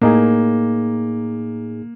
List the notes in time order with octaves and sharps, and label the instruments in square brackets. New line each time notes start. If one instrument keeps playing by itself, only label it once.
[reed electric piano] A2 D#4 G#4 [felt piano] A#3